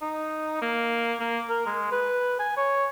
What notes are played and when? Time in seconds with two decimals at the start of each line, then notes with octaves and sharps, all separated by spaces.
0.02 D#4
0.62 A#3
1.20 A#3
1.50 A#4
1.66 G#3
1.92 B4
2.39 G#5
2.57 C#5